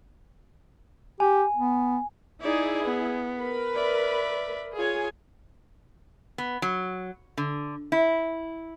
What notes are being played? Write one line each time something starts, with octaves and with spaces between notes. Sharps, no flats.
G4 G#5
B3
D#4 E4 G#4 D5
B3
A#4 B4 B5
D5 E5
F4 G#4 C#5 G#5
B3
F#3
D3
E4